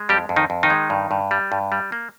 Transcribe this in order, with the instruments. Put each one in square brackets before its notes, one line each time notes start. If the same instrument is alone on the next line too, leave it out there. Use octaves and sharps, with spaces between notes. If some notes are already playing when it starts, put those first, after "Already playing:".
Already playing: [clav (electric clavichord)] G#3
F2 G3 G4
F2
D#3 D#4
F2
D#3 D#4
G#3
G2
G2
G3
G2
G3
A#3